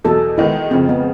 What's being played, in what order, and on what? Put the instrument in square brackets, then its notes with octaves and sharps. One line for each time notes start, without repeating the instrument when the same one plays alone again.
[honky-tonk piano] E2 B2 F#3 [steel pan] A4
[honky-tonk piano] D#3 G#3 B3 D#4 [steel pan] E4
[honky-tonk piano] F2 C#3 F3 [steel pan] C4
[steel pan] B3